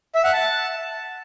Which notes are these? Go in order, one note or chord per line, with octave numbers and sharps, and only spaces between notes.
E5
F#5
A5